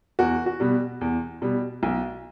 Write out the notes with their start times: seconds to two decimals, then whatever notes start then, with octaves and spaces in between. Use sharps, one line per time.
0.19 E2 F#4
0.46 F#4
0.60 B2 G3
1.01 E2
1.42 B2 G3
1.83 B1